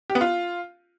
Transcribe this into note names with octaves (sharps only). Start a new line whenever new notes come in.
G4
B3
F4